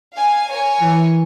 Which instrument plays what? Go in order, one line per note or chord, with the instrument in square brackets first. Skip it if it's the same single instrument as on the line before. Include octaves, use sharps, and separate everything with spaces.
[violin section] F5 G#5
A#4 C#5 G#5
[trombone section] E3